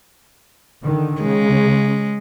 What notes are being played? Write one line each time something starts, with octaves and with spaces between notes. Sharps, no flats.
D3 D#3
C#3 G#3